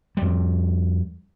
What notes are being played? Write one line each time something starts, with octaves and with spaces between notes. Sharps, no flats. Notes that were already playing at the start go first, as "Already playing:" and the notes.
F2 G3